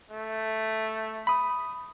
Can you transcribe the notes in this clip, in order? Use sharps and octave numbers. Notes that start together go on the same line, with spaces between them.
A3
B5 D#6